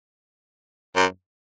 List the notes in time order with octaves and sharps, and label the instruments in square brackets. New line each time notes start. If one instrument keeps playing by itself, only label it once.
[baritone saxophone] F#2